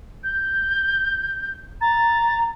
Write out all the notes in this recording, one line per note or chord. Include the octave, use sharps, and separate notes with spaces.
G6
A#5 A6